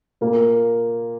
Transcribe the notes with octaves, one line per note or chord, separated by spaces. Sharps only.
A#2 A#3